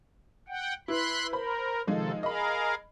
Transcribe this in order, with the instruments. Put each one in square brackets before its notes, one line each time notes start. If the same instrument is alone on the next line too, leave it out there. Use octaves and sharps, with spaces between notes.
[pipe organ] F#5 G5
[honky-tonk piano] E4 B4 [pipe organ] B5 C6 F#6
[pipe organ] A#4 [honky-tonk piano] C5 B5
[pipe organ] C3 D#3 A4 [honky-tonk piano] F3 G#3 D#4
[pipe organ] G#4 A#4 F5 [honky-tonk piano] D#5 B5